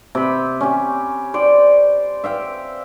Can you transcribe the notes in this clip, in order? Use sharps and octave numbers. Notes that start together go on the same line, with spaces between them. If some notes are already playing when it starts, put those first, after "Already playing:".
C3 B5
C#4 G4
C5 D5 G5
E5 F5 G5